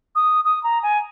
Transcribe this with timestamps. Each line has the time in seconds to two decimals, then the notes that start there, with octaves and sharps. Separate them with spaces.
0.15 D#6
0.45 D#6
0.64 A#5
0.83 G#5